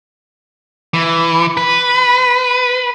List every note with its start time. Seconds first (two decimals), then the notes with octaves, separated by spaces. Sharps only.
0.94 E3
1.57 B4